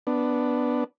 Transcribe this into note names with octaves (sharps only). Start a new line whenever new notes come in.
B3 D4